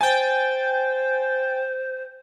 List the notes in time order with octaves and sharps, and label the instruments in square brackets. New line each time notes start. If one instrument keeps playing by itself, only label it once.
[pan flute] C5 [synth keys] G5 A6 [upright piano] G#5